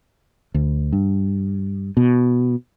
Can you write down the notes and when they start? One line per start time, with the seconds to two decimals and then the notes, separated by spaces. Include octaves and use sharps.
0.54 D2
0.93 G2
1.97 B2